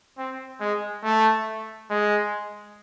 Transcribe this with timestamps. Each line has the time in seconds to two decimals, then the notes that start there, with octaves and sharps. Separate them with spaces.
0.18 C4
0.61 G#3
1.04 A3
1.90 G#3